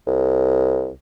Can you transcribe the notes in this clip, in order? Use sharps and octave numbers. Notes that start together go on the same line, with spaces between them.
C2